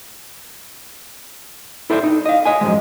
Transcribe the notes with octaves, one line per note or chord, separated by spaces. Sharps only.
E4 A4 C5 D5 E5
D#4
D#5 F5
C#5 D#5 G#5
F#2 D#3 F3 G#3